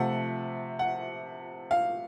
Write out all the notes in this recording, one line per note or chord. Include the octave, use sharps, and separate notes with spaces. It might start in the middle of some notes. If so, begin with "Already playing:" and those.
Already playing: C3 F3 A3 F#5
F#5
F5